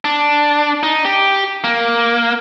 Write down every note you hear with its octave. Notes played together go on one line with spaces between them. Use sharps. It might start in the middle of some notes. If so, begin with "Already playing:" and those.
D4
D#4
G4
A#3